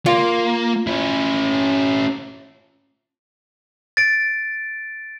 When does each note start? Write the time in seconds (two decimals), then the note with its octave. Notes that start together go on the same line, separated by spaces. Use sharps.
0.06 A#3 F4
0.87 C#4 E4
3.97 A6 D7